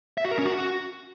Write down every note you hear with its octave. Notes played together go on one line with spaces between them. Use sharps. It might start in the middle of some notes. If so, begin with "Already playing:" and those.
E5
F#4
A#4
C#4
F#4